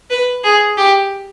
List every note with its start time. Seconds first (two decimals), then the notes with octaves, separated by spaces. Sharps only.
0.11 B4
0.44 G#4
0.77 G4